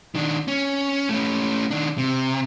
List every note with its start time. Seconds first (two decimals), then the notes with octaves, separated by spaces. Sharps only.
0.15 D#3 D4
0.48 C#4
1.09 A3 C#4
1.71 D#3 D4
1.98 C3